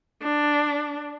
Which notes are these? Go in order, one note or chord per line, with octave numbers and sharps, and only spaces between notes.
D4